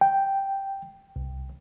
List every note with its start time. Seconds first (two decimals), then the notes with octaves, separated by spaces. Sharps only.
0.01 G5
1.16 C2